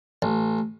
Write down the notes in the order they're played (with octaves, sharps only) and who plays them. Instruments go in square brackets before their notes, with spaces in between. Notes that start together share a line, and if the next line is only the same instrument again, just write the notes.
[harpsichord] A1